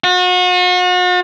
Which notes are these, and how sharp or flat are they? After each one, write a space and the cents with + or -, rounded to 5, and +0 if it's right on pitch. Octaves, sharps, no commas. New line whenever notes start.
F#4 -40